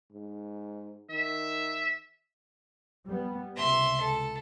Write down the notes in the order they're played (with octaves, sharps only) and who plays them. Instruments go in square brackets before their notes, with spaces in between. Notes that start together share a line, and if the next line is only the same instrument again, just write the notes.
[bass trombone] G#2
[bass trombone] D#3 [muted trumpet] E5
[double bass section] G3 B3
[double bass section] C#2 C3 [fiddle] E5 C6
[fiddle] A4